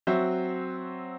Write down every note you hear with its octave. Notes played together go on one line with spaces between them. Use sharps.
F#3 C4 F#4 C5 E5